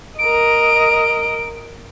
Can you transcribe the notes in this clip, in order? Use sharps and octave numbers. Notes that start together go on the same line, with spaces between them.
A#4 D#5 D7